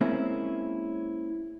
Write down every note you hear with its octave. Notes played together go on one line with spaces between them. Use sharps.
G#3 A#3 C4 C#4 E4